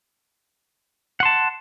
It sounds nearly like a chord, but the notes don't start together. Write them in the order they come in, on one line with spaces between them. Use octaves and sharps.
F#5 C6 A5